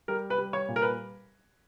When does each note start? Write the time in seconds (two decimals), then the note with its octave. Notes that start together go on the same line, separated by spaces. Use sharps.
0.08 G3 A#4
0.30 B4
0.38 G3
0.53 C#5
0.68 A#2
0.76 A#4
0.82 B4